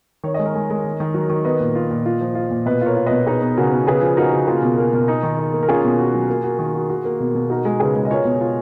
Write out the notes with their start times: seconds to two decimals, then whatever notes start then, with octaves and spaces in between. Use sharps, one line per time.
0.24 D#3 C#5
0.34 G#3 D#5
0.45 A#4 C#5
0.55 G#3
0.70 G#3
0.84 D#3
1.00 D#3
1.14 F#3
1.30 D#3
1.45 B3 B4 D#5
1.60 A#2
1.75 F4
1.91 A#2
2.06 F4
2.21 F3
2.35 F4
2.51 A#2
2.66 B2 B4 D#5
2.81 F4 A#4 C#5
2.97 F4
3.07 B2 B4 D#5
3.27 D#4 G#4 B4
3.41 B3
3.57 C#3 F#4 A#4
3.72 B3
3.87 C#3 G#4 B4
4.02 F3
4.17 D#4 F#4 A#4
4.33 C#3
4.47 A#3 F4 G#4
4.62 B2
4.78 A#3
4.93 B2
5.08 D#4
5.23 D#3
5.39 D#4
5.54 A#3
5.63 A#4
5.68 C#4 F4 G#4
5.84 B2
5.99 F#4
6.14 F#3
6.30 A#3
6.44 F#4
6.59 D#3
6.74 F#4
6.90 F#4
7.05 A#3
7.20 B2
7.35 B2
7.50 D#4 F#4 A#4
7.65 G#3
7.80 C#3 G#4 B4
7.95 G#3
8.05 D#5
8.10 F4 A#4 C#5
8.25 B2
8.41 F4